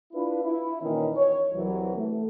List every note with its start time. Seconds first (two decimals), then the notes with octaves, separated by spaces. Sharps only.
0.13 D4 E4 F4 B4
0.43 E4
0.81 A#2 D#3 E3 C#4
1.15 C#5
1.53 C2 E3 F#3
1.96 A3